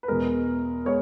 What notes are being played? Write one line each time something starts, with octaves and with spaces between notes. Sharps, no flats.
B4
E2 B2 G#3 B3 A#4
G#3 B3 C#5